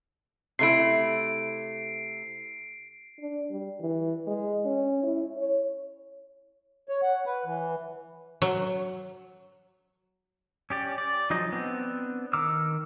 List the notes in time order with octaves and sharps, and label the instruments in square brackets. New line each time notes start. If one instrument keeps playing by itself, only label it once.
[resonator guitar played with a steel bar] C3 A3 E4 [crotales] C7 D7
[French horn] D4
G3
E3
G#3
C#4
E4
C#5
[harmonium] C#5
F#5
B4
E3
[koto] F#3
[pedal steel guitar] C#4 G4 D5
D5
F3 F#3 D#4 G#4 D#5
B3 C4 D4
D#3 A#5 D6 E6 F6